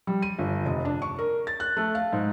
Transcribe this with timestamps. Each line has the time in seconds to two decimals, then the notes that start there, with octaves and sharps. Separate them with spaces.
0.07 G3
0.22 D#7
0.39 G1
0.66 F1
0.85 D4
1.02 C#6
1.19 A#4
1.47 A6
1.60 F#6
1.77 A3
1.95 F5
2.13 G#2